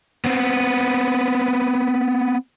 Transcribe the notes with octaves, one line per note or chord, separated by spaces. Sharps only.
B3 C4